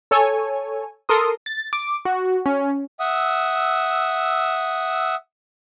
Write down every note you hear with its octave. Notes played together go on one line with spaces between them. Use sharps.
A4 C#5 G#5
A4 A#4 C6 D#6
A6
D6
F#4
C#4
E5 F#5 D#6 E6